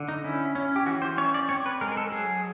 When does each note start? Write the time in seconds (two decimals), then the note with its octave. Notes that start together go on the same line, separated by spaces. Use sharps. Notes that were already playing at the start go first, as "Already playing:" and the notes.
Already playing: D3
0.08 D#4
0.24 C#4 E4
0.55 C#4
0.76 G4
0.86 E3 F#4
1.02 C5
1.18 C#4 C#5
1.34 D5
1.49 C4 C#5
1.66 B4
1.81 G#3 A#4
1.92 A#4
1.97 A4
2.12 F#3 G#4